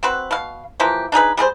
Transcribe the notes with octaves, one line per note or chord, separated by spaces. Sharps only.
C4 F#4 B4
B2 F5
E3 F3 A#3 G4
D4 D#4 G#4 B4
G3 G#4 A#4 C5